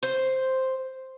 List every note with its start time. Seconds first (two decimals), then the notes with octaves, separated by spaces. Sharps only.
0.03 C5